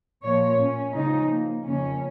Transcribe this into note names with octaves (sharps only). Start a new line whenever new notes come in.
A#2 F3 A#3 C#5
C#4
C#3 F3 G#3 D#4
A#3
F2 C#3 A#3 C#4